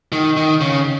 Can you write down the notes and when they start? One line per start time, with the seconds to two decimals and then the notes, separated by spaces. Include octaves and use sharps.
0.12 D#3
0.37 D#3
0.61 C#3